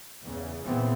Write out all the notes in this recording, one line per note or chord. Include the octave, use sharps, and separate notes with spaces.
E2 C#3
A#2 C#3 E3 B3 C4